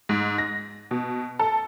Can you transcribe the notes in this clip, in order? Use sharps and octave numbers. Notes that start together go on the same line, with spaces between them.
G#2
A#6
B2
A4